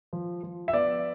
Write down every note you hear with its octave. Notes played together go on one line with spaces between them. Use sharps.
F3
F3
E5
B3 D5